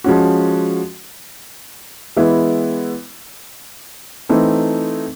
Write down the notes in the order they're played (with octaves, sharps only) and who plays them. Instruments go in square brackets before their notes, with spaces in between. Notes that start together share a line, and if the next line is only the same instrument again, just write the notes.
[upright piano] F3 G#3 C#4 F#4
E3 G#3 B3 E4
E3 A3 C4 D#4